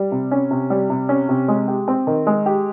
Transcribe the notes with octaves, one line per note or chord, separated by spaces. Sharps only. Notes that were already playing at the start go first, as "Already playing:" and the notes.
Already playing: G3
C3
C#4
C3
G3
C3
C#4
C3
G#3
G4
C4
D#3
G#3
G4